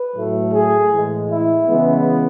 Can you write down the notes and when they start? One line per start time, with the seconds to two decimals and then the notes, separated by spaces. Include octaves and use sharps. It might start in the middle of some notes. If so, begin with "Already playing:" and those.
Already playing: B4
0.13 A2 F#3 A3
0.52 G#4
0.90 A2 E3 G#3
1.29 E4
1.67 C#3 E3 G#3 B3